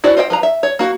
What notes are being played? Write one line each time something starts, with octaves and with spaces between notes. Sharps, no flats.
E4 F#4 C5 D5
F4 C5 D#5 F5 G5
F3 B4 A#5
E5
C#5
A#3 F#4